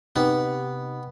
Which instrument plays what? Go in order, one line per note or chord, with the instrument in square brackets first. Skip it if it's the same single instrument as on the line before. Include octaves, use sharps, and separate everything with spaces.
[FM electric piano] C3 D#4 G4 [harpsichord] B3